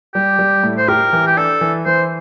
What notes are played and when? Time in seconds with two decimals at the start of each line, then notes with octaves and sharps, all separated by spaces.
0.14 G3 G4
0.39 G3
0.63 A2
0.77 C5
0.88 G4 A#4
1.12 E3
1.27 G4
1.37 D4 A4
1.61 E3
1.85 E3 C5